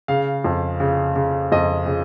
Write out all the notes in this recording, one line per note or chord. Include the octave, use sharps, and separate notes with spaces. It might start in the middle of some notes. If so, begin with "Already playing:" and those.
C#3 F5
F2
C#3
C#3
F2 D#5
C#3